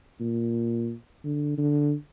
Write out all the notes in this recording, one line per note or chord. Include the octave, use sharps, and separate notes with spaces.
A#2
D3
D3